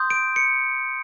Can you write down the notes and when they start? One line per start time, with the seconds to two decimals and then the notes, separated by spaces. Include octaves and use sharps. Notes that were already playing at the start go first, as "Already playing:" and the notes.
Already playing: C6 D#6 G6
0.10 D7
0.36 C#7